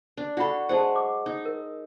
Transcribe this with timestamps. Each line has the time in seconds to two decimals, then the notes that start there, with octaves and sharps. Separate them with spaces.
0.17 D4
0.37 D4 F#4 A4 F#5 B5
0.69 G#3 G#4 C5 F#5 A5
0.95 D6
1.26 D#4
1.45 A#4